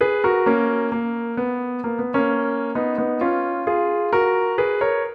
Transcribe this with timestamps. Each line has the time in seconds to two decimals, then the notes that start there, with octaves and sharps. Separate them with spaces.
0.01 G#4 B4
0.24 F#4 A#4
0.46 A#3 C#4
0.92 A#3
1.37 B3
1.84 A#3
1.99 B3
2.14 A#3 C#4
2.75 B3 D#4
2.97 B3 D#4
3.21 C#4 F4
3.67 F4 G#4
4.13 F#4 A#4
4.58 G#4 B4
4.81 A#4 C#5